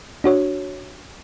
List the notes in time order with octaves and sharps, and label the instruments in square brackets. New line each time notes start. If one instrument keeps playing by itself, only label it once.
[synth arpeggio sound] D4 F#4 C#5